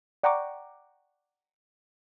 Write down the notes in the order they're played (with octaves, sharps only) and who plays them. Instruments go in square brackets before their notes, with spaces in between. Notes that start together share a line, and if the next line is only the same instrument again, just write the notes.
[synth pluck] D5 F#5 G5 A#5 C#6 D6